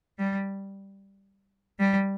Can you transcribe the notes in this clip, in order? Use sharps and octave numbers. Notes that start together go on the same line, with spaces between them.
G3
G3